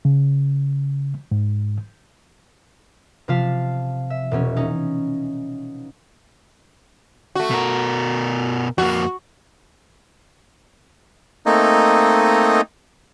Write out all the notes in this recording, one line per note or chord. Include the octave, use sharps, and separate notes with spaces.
C#3
G#2
C3 F3 F4 F5 A5 B6
E5
E1 B2 C#4
C#4 D#4
A3 F#4
B2 A#4
F2 A#3 F#4
A3 A#3 C4 D#4 D#5